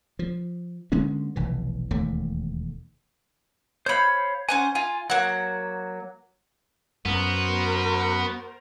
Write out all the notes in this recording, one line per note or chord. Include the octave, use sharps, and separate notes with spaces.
F3
D3 G#3 A#3 C#4
F1 B1 E3
E1 D#2 A3
C5 C#5 F5 B5 G6
C#4 C5 F#5 G#5
F4 G#5
F#3 A#3 F#5
F#2 B3 F#4 A#4 C5